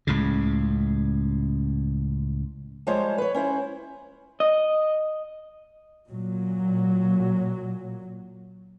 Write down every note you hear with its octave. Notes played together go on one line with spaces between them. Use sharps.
C#2 A2 C#3
F3 G3 G#3 C5 C#5
B4 C#5
C#4 E4 C5
D#5
A#2 F#3